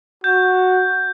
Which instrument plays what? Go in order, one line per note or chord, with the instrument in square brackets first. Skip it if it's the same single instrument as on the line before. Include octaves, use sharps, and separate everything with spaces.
[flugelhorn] F#4 [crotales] G6